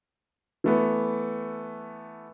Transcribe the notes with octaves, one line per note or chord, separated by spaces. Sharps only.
E3 A3 B3